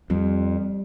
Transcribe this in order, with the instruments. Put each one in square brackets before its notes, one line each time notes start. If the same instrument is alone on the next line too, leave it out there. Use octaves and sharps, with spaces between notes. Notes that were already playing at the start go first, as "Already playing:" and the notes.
[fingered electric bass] F2 [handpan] G3